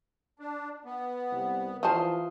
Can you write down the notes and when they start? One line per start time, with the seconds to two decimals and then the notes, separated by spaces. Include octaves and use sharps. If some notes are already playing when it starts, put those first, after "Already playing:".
0.39 D4
0.85 B3
1.31 C2
1.83 E3 F3 F4 A5 C6 D#6